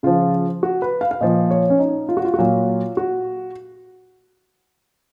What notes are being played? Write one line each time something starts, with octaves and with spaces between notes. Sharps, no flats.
C#3 F3 F4
F#4
B4
F5
F5
A#2 F3 D#5
C#5
C#4
D#4
F4
F#4
F4
F#4
A#2 F#3 F4
F#4